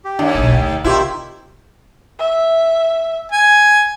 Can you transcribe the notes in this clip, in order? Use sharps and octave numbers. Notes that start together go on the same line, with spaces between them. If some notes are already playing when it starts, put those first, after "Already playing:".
G4
D#2 D4
F#1 B1 G#5
D2 G5
C3 D#3 E4 F4 G4 C5
E5
G#5